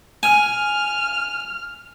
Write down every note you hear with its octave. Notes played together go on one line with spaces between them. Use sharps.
G#5 F6